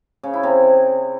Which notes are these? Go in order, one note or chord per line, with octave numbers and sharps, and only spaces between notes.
C#3
E4
C3